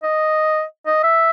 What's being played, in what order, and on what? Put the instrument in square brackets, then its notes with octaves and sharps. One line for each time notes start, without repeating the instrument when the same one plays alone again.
[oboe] D#5
D#5
E5